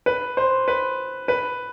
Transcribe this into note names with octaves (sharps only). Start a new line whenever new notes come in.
B4
C5
B4
B4